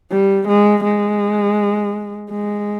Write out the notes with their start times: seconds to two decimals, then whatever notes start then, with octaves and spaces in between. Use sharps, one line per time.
0.11 G3
0.48 G#3
0.84 G#3
2.30 G#3